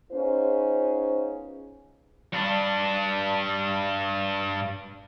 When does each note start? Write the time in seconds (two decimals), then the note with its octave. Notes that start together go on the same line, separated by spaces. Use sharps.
0.11 B3 C#4 D#4 F4 G#4 C5
2.33 G2 D4